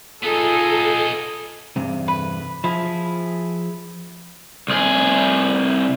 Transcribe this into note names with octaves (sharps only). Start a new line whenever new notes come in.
B3 D#4 F4 G#4 A4
E2 G2 C3
B4
F3 E4 G#4
C2 G#4